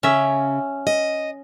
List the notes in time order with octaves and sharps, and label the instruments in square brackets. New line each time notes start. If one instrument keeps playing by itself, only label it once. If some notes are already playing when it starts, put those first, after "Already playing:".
[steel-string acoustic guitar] C#3 [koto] C#4 E5
[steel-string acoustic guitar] D#5